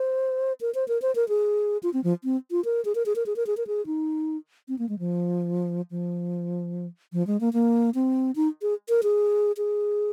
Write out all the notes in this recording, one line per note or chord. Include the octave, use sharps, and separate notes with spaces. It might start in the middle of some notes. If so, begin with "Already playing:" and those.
Already playing: C5
A#4
C5
A#4
C5
A#4
G#4
F4
C4
F3
C4
F4
A#4
G#4
A#4
G#4
A#4
G#4
A#4
G#4
A#4
G#4
D#4
C4
A#3
G#3
F3
F3
F3
G#3
A#3
A#3
C4
D#4
G#4
A#4
G#4
G#4